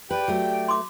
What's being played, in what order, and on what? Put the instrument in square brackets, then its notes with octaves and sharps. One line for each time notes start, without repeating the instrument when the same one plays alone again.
[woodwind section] G4 D5 G5 [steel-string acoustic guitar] B4
[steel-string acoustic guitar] F#3 A3
[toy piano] C6 D6